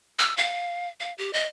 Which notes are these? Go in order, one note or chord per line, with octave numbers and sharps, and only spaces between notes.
E6
F5
F5
G4
D#5